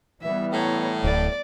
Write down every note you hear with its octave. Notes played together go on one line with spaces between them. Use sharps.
E3 G3 B3 E5
A2 C#5 A#5
D1 D5